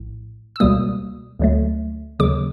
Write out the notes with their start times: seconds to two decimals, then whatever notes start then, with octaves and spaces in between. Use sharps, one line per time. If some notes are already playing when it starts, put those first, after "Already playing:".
Already playing: A#1 A2
0.56 E6
0.60 C#2 B2 G3 A#3 D#6
1.39 D2 D3 F#3 A3
2.19 D#2 C#3 F#3 D6